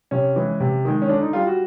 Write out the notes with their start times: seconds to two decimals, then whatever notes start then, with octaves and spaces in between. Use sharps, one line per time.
0.11 C3 C#4
0.36 E3 G#3
0.60 C3
0.85 D#3 G#3
1.02 C#4
1.09 D3 D4
1.21 D#4
1.33 G3 F4
1.47 F#4